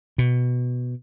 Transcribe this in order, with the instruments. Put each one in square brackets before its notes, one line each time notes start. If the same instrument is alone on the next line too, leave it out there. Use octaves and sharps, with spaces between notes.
[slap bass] B2